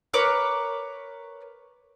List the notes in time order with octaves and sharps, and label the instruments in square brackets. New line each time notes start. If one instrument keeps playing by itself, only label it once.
[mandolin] A#4 B4 C#5 D6